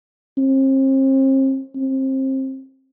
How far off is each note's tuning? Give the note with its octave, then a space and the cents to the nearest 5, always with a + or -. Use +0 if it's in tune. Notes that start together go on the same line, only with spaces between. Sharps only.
C4 +40
C4 +25